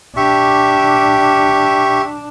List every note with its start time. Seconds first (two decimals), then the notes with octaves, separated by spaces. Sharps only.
0.17 D4 G4 E5 C#6